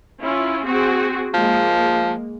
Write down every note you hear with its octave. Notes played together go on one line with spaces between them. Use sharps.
C#4 E4 F4
C4 F#4 G#4
F3 G#3 A#3